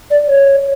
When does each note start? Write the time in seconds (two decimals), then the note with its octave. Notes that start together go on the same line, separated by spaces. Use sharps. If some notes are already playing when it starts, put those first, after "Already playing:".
0.11 D5
0.28 C#5